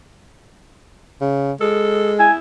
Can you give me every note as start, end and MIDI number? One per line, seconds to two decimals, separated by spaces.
1.21 1.52 49
1.61 2.28 56
1.61 2.14 69
2.19 2.39 64
2.19 2.32 80